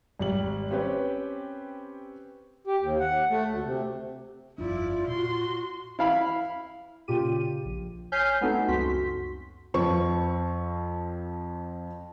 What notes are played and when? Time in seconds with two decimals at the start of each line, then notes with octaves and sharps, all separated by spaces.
0.20 G#1 G3 F#7
0.71 C4 C#4 G4 B4
2.67 G4
2.80 D#2
3.00 F#5
3.29 A3
3.48 D2
3.64 C3
4.58 G1 F2 D4 E4 F4 D5
5.08 A#2 F#4 C6
5.99 E4 F5 B5
7.08 A#2 C#3 F4 G4 D#7
7.65 A#1
8.12 C#5 G#5 F6 G6 B6 C7
8.41 A3 B3 C4 D#4 F#4 A4
8.68 C#2 F#2 F#4 C6 B6
9.74 F2 F3 C#6